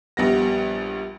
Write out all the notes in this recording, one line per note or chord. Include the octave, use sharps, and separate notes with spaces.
A#1 G3 B3 A#6